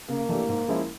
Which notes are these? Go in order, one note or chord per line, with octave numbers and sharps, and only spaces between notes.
C#3 A#3
E3 A3 D4 G4
G#2
F3 G#3 C#4 E4